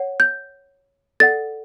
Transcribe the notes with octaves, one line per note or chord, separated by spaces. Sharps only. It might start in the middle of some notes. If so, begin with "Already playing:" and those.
Already playing: C#5 F#5
G6
A4 D5 F#5 A6